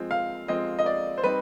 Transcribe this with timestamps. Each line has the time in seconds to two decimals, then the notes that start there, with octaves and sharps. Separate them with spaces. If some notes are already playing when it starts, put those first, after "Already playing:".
Already playing: F3 G#3 C4
0.11 F5
0.48 F3 G#3 C4 D#5
0.79 D#5
0.86 D5
1.18 C5
1.23 G3 C4 D#4 B4